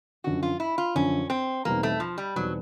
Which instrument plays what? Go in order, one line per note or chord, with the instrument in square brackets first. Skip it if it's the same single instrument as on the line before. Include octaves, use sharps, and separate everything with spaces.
[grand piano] F#2 D3 F3 [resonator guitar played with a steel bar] F#4
[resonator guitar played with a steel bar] F4
E4
F4
[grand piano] F#2 D3 F3 [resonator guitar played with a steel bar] C#4
[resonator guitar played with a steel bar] C4
[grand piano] E2 B2 G3 C4 D#4 [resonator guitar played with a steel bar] A#3
[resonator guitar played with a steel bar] A3
F3
G3
[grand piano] E2 B2 G3 C4 D#4 [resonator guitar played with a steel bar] F#3